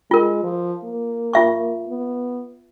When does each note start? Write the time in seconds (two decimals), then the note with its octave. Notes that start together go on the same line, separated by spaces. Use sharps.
0.11 G#3 F4 A#4
0.44 F3
0.84 A#3
1.33 F4 E5 C#6
1.88 B3